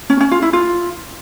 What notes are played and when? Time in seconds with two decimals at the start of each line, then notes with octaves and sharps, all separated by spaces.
0.10 C#4
0.21 C#4
0.31 F4
0.42 E4
0.53 F4